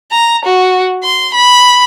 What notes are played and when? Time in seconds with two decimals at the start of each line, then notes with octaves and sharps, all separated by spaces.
0.11 A#5
0.45 F#4
1.03 C6
1.34 B5